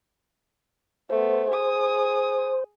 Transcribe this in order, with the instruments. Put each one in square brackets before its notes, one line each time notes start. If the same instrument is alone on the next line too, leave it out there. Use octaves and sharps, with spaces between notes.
[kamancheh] A3 B3 [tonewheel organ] C5
[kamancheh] G#4 D#6